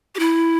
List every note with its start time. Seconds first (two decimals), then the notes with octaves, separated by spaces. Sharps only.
0.15 G4
0.19 E4